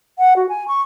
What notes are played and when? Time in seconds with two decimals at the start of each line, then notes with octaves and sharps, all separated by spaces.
0.18 F#5
0.36 F#4
0.49 G#5
0.68 C#6